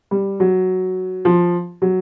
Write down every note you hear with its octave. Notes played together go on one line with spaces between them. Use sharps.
G3
F#3
F3
F#3